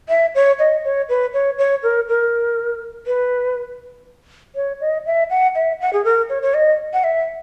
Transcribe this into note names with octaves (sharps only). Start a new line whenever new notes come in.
E5
C#5
D#5
C#5
B4
C#5
C#5
A#4
A#4
B4
C#5
D#5
E5
F#5
E5
F#5
G#4
A#4
C#5
C#5
D#5
F#5
E5